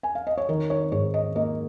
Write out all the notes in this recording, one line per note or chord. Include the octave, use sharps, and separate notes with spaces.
G#5
F5
D#5
C#5
D#3 A#4
C#5
G#2 C#5
D#5
A#3 D#5